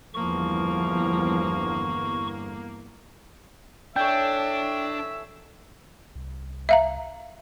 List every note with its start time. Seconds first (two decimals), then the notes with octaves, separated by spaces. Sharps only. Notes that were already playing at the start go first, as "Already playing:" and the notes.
0.14 G1 E2 F3 A#3 C#6
3.96 E3 D4 A4 C#5 E5 G5 G6
6.15 C2
6.69 E5 F5 A#5